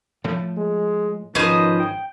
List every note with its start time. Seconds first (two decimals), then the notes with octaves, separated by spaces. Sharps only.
0.24 A2 F3 A3
0.57 G#3
1.35 G#1 D#3 F3 C#4 D#4 B4 C5 D#5
1.80 G5